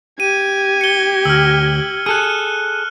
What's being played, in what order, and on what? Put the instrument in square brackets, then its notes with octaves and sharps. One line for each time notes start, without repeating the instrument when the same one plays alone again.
[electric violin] G4 G#6 [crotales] D#7
[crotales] C#7 G7
[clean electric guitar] D2 [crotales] E6 F6
[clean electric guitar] G#4 A4 [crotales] F6 F#6